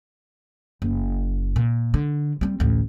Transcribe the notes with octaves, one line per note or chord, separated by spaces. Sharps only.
F#1
A#2
D3
G3 C4
A1 D2